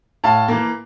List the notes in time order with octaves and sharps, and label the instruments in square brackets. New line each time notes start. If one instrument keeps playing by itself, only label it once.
[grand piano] A2 F5 A5
E3 A#3